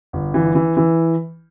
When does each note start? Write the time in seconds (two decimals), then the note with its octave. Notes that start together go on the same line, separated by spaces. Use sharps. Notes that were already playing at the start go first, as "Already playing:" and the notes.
0.13 G1
0.34 E3
0.55 E3
0.77 E3